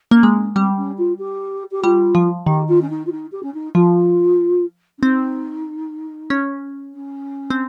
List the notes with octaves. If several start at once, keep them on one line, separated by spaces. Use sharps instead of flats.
A#3 C#4
G#3
C#4
G3 C4
C#4
F4
G4
G4
G3 F4
F3
D#3 G4
F4
C#4
D#4
F4
D#4
G4
C#4
D#4
F3 F4
C#4
C4 D#4
C#4
C#4
C4